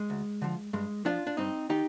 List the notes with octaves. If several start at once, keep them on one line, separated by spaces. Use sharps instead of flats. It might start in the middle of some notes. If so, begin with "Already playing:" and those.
Already playing: G#3
D2
D3 F3
G2 G#3
F3 D4 F4
D4
G2 C4 D#4
D#3 D#4 G4